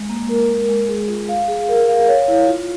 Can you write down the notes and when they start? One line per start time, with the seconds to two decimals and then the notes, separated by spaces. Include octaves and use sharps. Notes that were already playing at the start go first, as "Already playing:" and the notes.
Already playing: G#3
0.09 A#3
0.29 A#4
0.49 G#3
0.69 G#3
0.89 G#4
1.08 F4
1.29 F5
1.48 G#4
1.69 A#4
1.88 F5
2.08 C#5
2.28 E4
2.48 F4